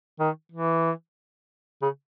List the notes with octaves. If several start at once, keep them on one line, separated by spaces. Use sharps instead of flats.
D#3
E3
C#3